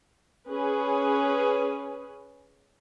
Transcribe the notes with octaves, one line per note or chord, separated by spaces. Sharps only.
C#4 G#4 B4